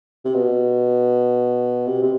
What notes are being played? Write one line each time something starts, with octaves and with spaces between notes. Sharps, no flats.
C3
B2
C3
C3